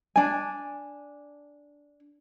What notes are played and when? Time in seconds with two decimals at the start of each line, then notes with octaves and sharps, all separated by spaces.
0.16 D4 G#5